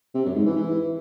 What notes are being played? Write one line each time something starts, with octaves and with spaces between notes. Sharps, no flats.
C3
F#2
G#2
E3
E3